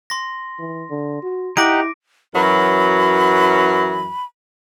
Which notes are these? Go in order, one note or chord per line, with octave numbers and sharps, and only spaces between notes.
C6 A#6
E3
D3
F#4
D#4 E4 G4 F#5 D6 A#6 D7
F#2 E3 F#3 B5